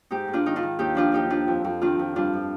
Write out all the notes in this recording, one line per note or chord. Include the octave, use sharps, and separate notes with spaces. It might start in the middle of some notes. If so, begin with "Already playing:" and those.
G#2 D#4 G4
G#2
D4 F4
D#3 D#4
D4 F4
D#3
D#2 D#4 G4
F3 D4 F4
D#2 D#4 G4
F3 D4 F4
F2
F2
D#3 D4 F4
F2
G2 D4 F4
F3